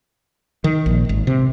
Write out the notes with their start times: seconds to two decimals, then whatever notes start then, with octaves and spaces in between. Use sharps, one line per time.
0.64 D#3
0.86 A#1
1.09 G#1
1.27 C3